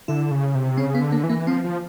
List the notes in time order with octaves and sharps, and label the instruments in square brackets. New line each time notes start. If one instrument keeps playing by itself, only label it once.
[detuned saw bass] D3 [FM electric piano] E4
[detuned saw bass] C#3
C3
[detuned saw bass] C#3 [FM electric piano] C4
[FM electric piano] B3
[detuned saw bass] D3
[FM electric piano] A#3
[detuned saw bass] E3
[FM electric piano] A#3
[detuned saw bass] F3 [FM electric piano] C4
[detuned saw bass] F3